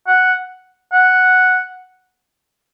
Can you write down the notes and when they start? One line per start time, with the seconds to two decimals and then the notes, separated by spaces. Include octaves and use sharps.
0.08 F#5
0.93 F#5